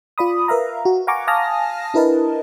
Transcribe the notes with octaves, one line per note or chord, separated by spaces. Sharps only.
F4 D5 B5 D#6
A#4 B4 E5 F5 A#5
F#4
F5 F#5 G#5 A#5 C#6 D6
F5 G#5 A5 D#6 F6 A#6
D4 E4 A#4 B4 D#5 A5